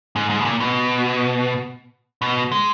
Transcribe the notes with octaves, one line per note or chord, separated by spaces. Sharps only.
G#2
G#2
B2
A#2
B2
B2
G#3